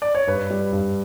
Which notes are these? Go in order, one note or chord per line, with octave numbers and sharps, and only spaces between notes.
D5
C#5
G2 B4
G3
G2